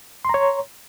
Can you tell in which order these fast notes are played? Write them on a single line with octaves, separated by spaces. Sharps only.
C6 A#5 C#5